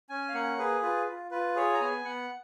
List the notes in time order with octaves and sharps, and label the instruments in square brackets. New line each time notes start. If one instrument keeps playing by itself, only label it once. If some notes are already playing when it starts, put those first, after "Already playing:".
[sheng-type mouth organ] C#4 G#5
F5
A#3 F#5
G#4 B4
F4 B4
F4
F4 B4
G#4 C#5
A#5
B3 G#5
B3 F#5